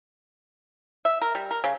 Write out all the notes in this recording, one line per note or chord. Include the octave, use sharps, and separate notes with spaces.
E5
A#4
G3
A#4
C#3